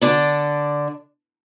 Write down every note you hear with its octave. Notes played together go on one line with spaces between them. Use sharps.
D3 D4 D5